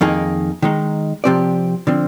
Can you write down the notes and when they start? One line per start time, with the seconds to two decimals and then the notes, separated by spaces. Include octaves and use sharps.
0.01 F2 D#3 A#3 D#4 G#4
0.62 D#3 G#3 D#4
1.24 C3 F3 C4 G4 D5
1.87 D3 F3 C4